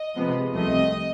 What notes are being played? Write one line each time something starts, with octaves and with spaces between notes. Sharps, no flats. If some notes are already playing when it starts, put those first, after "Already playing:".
Already playing: D#5
C3 F3 G#3 B3
C2 C3 F3 A3 D#5